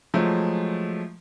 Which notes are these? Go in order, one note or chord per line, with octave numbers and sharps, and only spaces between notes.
F3 F#3 G#3 A3